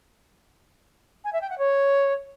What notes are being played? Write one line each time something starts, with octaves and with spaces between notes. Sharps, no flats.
G#5
E5
G5
F#5
C#5